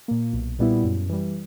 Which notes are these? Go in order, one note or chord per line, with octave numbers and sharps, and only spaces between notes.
A#2 A#3
B1
A#2 G3 B3 E4
F#2
E3 G3